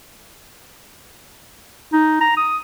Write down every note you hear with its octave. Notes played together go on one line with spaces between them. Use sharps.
D#4
A#5
D#6